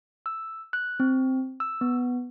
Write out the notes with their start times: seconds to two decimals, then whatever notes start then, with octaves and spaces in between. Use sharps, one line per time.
0.26 E6
0.73 F#6
1.00 C4
1.60 E6
1.81 B3